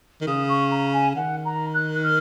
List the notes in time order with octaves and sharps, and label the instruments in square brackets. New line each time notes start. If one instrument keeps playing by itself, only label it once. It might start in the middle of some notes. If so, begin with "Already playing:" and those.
[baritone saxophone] D#3
[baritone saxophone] C#3 [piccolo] D#6
[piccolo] C#6
A#5
G#5
[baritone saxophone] D#3 [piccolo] F#5
[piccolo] A#5
F#6
F6